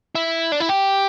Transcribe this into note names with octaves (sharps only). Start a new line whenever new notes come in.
E4
D4
E4
G4